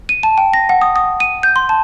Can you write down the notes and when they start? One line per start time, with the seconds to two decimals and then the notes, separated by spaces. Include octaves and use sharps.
0.09 D#7
0.23 A5
0.38 G5
0.54 A#6
0.69 F#5
0.81 D#6
0.96 D#6
1.20 D#7
1.43 G6
1.56 C6
1.69 A5